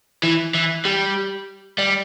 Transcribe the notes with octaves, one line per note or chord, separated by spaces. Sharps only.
E3
E3
G3
G3